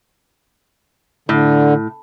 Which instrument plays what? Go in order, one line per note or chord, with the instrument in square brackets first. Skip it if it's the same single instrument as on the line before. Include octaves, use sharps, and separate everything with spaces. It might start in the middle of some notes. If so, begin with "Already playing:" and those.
[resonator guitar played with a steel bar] A2 [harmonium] D3